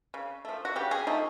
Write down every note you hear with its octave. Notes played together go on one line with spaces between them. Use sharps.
C#3
F3 A3
F#4
C#3 G4
G#4
F3 A3 D#4